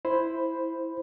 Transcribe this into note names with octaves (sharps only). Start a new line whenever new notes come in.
E4 C5 B5